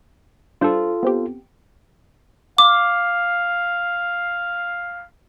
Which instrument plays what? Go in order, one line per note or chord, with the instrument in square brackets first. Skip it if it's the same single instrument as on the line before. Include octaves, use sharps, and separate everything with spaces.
[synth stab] G3 D4 C5 [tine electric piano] F4 A4
[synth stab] B3 C4 G4
[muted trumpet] F5 [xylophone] D6